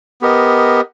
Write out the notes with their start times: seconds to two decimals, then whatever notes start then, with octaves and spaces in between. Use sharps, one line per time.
0.21 B3 G4 A#4 D#5